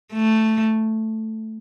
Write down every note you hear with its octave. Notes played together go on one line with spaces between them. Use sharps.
A3